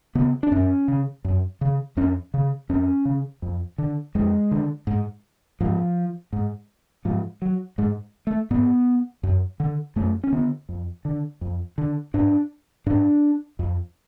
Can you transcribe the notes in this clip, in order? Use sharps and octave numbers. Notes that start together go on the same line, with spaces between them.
C#3 B3
D4
F#2 C#4
C#3
F#2
C#3
F2 C#4
C#3
F2 C#4
C#3
F2
D3
F2 G#3
D3
G#2
G#2 F3
G#2
G#2 F3
F#3
G#2 G#3
A3
G#2 B3
F#2
D3
F#2 A3
C#4
D3 B3
F2
D3
F2
D3
G#2 D4
G#2 D4
F2